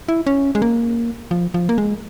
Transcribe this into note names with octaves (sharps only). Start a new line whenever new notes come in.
E4
C#4
G#3
A#3
F3
F3
A#3
G#3